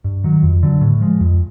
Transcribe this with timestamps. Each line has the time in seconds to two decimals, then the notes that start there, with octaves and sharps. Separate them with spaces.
0.04 G2
0.24 D#3 F#3
0.43 F2
0.63 D3 F#3
0.81 A2
1.01 F3 G#3
1.20 F2